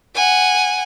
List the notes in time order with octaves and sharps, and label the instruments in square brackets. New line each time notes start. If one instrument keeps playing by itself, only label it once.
[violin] F#5 G#5